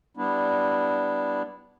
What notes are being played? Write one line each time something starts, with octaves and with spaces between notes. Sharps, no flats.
G3 B3 D4 E4